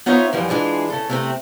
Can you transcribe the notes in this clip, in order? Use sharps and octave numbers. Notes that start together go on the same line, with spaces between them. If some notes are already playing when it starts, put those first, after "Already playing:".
B3 D#4 F4 C5 C#5 E5
F#2 E3 F3 G3
E3 G#3 D4 F4
C#3 A4
C3 A3 C4